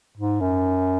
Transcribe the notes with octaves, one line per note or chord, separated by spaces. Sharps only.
G#2
F#2